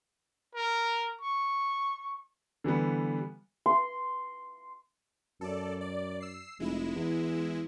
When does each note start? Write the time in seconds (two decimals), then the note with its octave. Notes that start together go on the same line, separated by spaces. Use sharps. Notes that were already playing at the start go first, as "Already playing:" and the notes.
0.55 A#4
1.21 C#6
2.64 D3 E3 G3 B3
3.66 C6
5.41 F#2 A4 D5
5.81 D5
6.20 E6 C7
6.60 F1 G#3 E4 E7
6.95 E2